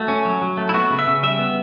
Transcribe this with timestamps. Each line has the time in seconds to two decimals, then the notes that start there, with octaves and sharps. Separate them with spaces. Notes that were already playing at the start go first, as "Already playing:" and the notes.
Already playing: A3 F#4
0.08 C#4
0.25 F#3
0.42 F#3
0.58 A3
0.69 E4
0.74 B3 F#4
0.90 C#3
0.99 E5
1.07 C#3
1.23 G3 E5
1.39 B3